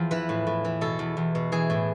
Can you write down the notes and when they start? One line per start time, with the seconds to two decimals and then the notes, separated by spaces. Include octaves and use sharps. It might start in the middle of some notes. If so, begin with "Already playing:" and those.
Already playing: E2 F3
0.11 E3 B4
0.29 A2
0.47 A2
0.65 E3
0.81 B2 A4
0.99 E2
1.17 E2
1.35 B2
1.52 E3 G#4
1.70 A2